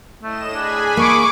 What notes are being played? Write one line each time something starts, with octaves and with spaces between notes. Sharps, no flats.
A2 A3 D#5 E7
D4 G#4 G#5 B5
A#3 C#6 D6